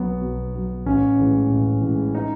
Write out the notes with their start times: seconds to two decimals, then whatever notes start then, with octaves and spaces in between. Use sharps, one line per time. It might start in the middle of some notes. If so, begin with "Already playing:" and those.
Already playing: B1 B2 F#3 B3
0.21 B1
0.54 B2 F#3
0.86 A1 C#4
1.18 A2 E3 G#3
1.50 A1
1.81 A2 E3 G#3
2.15 D#4